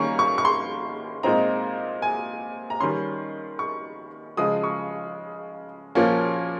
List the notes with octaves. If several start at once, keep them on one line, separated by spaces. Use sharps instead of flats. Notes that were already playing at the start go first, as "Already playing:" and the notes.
Already playing: D#3 G3 A#3 C#4 A#5 C#6
C#6
C#6
C6
A#2 G#3 C4 D#4 A#5
G#5
A#5
D#3 G3 C#4 C6
C#6
C#3 F3 G#3 D#6
C#6
A#2 F3 A#3 C#4